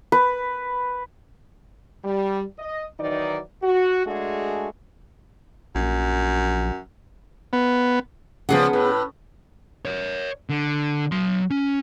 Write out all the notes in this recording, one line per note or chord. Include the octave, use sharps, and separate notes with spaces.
B4
G3
D#5
D#3 E3 F#3 D#4 D5
F#4
G#3 A3 D4 F#4 G#4
A#1 F#2
B3
C#3 F3 B3 G#4 F#5
A2 B4
A#4 C#5
D3
F#3 C6
C#4